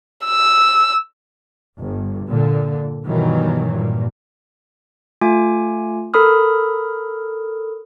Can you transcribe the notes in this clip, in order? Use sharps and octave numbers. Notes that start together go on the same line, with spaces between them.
E6
G1
A#2 D3
G2 B2 D#3 E3 F#3
G2 A#2
A3 F4 G#5 D6
A4 A#4 B5 D#6 F6